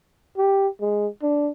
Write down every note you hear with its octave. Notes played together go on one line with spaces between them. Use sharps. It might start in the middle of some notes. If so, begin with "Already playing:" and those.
G4
G#3
D4